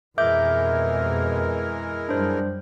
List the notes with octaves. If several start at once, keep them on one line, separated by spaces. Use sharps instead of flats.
F2 B2 E3 G#3 A#4 E5 D6 G6
F#2 G3 D4 C5